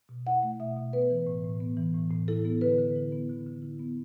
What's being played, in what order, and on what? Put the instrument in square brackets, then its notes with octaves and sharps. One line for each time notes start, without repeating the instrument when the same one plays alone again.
[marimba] B2
E4 F#5
A3
B2 E5
B2
B3 B4
E3
A2
A2
B3
E3
A2
A2
E4 A4
B3
D3 B4
D3
E4
B3
D3
D3
E4
B3